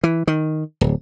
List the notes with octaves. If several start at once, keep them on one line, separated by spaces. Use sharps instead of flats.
E3
D#3
D1